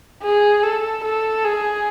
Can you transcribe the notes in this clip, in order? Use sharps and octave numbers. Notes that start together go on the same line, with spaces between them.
G#4
A4
A4
G#4